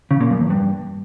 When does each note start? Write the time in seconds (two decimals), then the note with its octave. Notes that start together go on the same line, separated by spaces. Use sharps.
0.11 C#3
0.21 A#2
0.30 F#2
0.40 E2
0.50 G2